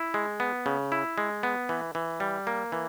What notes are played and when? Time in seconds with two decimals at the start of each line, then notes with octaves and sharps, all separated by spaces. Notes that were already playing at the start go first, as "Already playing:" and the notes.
Already playing: E4
0.14 G#3
0.40 B3
0.66 C#3
0.92 E4
1.18 G#3
1.43 B3
1.69 E3
1.95 E3
2.20 G3
2.47 A#3
2.72 E3